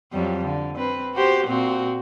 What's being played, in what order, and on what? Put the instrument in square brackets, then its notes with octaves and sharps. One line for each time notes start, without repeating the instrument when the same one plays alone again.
[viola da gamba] F2 F#3 G3
D3
C4 B4
F#4 G4 C5
A#2 C4 F#4